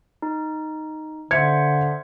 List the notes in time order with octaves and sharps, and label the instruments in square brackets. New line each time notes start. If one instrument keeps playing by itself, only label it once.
[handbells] D#4
[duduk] D3 [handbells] C5 E5 C6 [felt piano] G#6 C#7